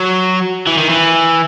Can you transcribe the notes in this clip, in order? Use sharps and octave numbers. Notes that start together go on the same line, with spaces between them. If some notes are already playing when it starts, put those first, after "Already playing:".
Already playing: F#3
E3
D#3
E3